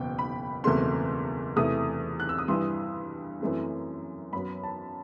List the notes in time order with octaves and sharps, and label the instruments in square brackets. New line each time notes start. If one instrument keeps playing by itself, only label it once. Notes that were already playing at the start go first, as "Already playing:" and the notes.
Already playing: [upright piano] F#1 E2 B2 G5
B5
F#1 E2 B2 A3 C4 C6
E2 C3 E3 A3 D#6
F#6
E6
D#6
G2 E3 G3 C6
F#2 E3 A3 C4
F#2 F#3 B3 B5
A5